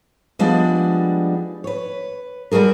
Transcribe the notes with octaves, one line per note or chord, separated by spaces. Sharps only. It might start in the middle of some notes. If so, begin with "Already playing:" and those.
F3 G3 G#3 B3 D4
B4 C#5
G3 G#3 F#4 G#4 A#4